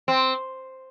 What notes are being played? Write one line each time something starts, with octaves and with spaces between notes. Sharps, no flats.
C4